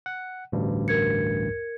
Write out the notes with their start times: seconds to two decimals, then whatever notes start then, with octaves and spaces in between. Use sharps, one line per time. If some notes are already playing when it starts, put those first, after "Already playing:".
0.06 F#5
0.52 A1 D2 G2
0.88 A#4 G#6 C#7